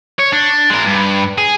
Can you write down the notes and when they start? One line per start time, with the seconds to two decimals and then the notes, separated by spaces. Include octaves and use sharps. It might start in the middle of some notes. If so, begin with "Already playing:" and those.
0.20 C#5
0.33 D4
0.70 G#3 A#4
0.87 G2
1.38 G#4